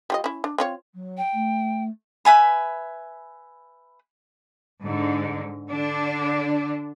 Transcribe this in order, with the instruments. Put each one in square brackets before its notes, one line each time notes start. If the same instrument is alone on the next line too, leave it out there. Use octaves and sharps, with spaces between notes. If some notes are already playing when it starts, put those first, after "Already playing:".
[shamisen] G3 F4 D#5
C#4 E4
D4
C4 F4 C#5
[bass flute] F#3
[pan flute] G5
[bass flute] A3
[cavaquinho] B4 E5 G#5 B5
[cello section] G#2 D3
D3 D4